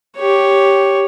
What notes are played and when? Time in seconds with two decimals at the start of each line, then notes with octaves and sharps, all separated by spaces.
0.17 G4 C#5